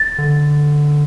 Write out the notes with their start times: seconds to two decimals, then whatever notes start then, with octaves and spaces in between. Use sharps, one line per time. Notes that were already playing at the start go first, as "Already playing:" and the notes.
Already playing: A6
0.18 D3